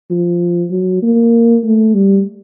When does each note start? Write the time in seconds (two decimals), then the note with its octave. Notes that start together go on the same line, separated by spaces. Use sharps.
0.10 F3
0.71 F#3
1.02 A#3
1.64 A3
1.94 G3